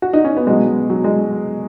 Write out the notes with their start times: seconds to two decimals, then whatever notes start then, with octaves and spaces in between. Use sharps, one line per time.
0.02 F#4
0.13 D#4
0.24 C#4
0.37 B3
0.47 B2 F#3 G#3
0.90 F#3
1.04 G#3